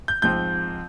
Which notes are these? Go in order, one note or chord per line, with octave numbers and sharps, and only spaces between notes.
G6
G#2 F3 C4 G6